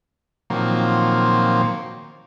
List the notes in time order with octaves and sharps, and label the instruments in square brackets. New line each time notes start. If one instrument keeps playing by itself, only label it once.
[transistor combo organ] A#2 D#3 F3 F#3 A#3 C4